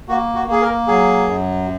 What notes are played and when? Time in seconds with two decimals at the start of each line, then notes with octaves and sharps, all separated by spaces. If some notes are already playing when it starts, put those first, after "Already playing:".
0.08 A#3 F#4
0.35 F#4
0.48 A#3 G#4
0.61 A#4
0.88 F#3 G#4
1.27 F#2